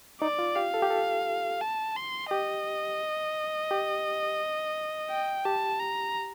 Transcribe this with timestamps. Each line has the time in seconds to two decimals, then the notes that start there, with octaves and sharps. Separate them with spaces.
0.21 D#4 D5
0.39 F4
0.56 G4 F5
0.74 A4
0.82 G4
0.90 A4
1.61 A5
1.96 C6
2.30 G4 D#5
3.71 G4
5.10 G5
5.45 G4 A5
5.80 A#5